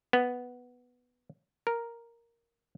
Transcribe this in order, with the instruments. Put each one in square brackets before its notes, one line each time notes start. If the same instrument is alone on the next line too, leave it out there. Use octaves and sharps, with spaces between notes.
[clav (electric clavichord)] B3
A#4